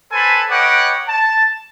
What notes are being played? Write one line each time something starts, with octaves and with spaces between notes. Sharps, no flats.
A4 B4 C5 G#5 A5 B5
B4 C#5 D#5 F#5 G5 D6
A5